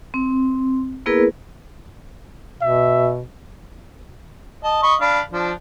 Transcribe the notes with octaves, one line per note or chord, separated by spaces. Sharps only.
C4
A#3 B3 E4 G#4 A#4 B4
B2 E5
D#5 A5
D#5 B5 C#6
D4 F5 B5
F3 D4